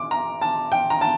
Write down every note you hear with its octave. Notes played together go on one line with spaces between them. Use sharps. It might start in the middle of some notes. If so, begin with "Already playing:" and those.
Already playing: D6
A#5
A5
G5
A#5
A5